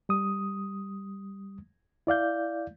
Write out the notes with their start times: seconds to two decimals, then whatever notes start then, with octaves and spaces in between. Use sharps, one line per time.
0.09 G3 D#6
2.07 E4 D5 F5 G6